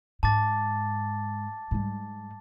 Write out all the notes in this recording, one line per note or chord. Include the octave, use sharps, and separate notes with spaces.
G#2 A5 D6 A6
G#2 G3